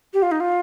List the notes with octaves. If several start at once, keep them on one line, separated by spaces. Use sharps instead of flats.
G4
F4
D#4
F4